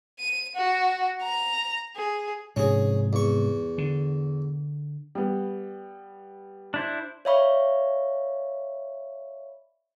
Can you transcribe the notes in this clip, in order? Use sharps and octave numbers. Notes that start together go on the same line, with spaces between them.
D#7
F#4
A#5
G#4
G#2 C3 F3 C#4 G#4
E2 C#6
D3
G3 B3
D4 E4 C5
C#5 D5 E5 F5 B5 C#6